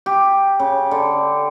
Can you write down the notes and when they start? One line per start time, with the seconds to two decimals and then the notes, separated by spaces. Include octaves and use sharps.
0.06 G4
0.60 C#3
0.91 D3